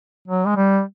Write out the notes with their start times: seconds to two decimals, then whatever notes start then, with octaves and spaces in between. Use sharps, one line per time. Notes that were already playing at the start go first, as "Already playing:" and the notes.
0.28 F#3
0.46 G#3
0.56 G3